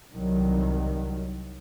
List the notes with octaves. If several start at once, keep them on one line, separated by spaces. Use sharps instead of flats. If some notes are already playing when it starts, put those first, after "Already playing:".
C2 D#3 F#3